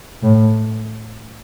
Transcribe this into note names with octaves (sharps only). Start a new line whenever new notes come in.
A2